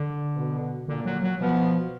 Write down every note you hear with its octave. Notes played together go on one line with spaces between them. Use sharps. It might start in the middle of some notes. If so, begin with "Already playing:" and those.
Already playing: D3
B2 B3
A#2 D3 A#3
F#3
F#3
B2 F3 B3